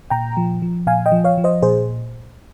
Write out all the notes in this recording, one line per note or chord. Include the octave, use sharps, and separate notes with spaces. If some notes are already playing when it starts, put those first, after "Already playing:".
A#2 G5 A#5
F3
F3
A#2 F5 G#5
D#5 G5
F3
C#5 F5
F3
C5 D#5
A#2 G#4 C5